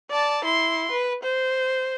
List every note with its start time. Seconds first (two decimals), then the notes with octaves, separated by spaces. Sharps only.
0.11 D5 A5
0.45 E4 C6
0.91 B4
1.23 C5